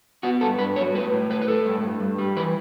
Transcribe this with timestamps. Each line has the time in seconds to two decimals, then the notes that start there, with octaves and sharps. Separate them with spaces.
0.23 B3 F#4
0.41 G2 A4
0.59 G2 B4
0.76 F#3 C#5
0.94 A2 B4
1.12 A2
1.30 A2 B4
1.42 B4
1.48 A2 A4
1.65 G2
1.83 G2
2.00 G2
2.19 G3
2.36 E3 B4